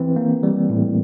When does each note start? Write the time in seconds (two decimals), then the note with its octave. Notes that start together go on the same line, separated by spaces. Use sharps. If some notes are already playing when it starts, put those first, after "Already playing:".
Already playing: E3 C4
0.16 A#3
0.43 G3
0.70 A2